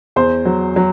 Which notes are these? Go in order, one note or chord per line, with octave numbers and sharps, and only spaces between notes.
E2 C5 C6
F#3
F#3